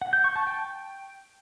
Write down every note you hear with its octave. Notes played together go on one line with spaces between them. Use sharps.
F#5
G6
C#6
A5
G5